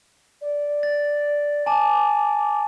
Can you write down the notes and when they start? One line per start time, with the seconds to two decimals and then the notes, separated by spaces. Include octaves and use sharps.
0.41 D5
0.83 A6
1.66 G#5 A5 D6